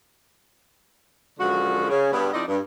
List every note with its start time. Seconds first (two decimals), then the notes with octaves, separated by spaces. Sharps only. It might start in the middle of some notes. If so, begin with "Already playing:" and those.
1.39 F#2 D3 F3 G#3 F#4
1.89 C#3
2.12 G2 B3
2.33 F3 C4 D#4 E4 D5 D#5
2.48 G2